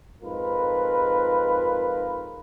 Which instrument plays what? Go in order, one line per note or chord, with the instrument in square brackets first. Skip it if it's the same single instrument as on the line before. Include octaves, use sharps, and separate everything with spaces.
[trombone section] F2 G#2 F4 A#4 B4